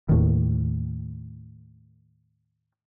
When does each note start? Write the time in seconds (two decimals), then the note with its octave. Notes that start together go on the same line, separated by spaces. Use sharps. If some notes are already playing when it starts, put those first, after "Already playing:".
0.09 D#2 A2 D#3